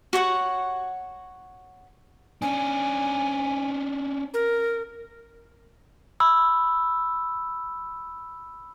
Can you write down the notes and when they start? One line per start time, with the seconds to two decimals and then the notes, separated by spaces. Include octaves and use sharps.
0.13 F#4 C#5 F#5
2.42 C#4 D4 G#5
4.34 A#4
6.20 B5 E6